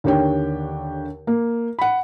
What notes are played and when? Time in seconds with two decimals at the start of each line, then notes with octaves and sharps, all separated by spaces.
0.04 D#2 D3 G4 C#5 G5
1.27 A#3
1.79 F#5 B5